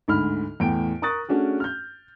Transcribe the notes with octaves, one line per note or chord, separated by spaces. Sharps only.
D2 G#2 B5 F6
E2 A2 G5 D7
A#4 A#5 C#6 D#6 F#6 A6
A3 C#4 D4 F#4 G#4
F6 G6